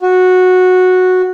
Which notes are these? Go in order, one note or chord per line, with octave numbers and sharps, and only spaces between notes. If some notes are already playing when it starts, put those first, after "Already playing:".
F#4